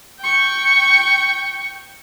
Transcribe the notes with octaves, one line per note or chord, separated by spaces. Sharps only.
G5 C#6